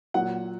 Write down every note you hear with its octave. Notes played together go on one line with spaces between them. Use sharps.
A#2 F#3 F#5